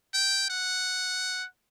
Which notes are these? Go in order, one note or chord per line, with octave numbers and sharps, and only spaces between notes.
G5
F#5